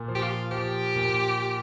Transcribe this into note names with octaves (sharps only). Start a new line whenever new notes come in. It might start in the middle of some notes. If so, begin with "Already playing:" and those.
Already playing: A#2
F3
G4
F4
F3 G4
A#2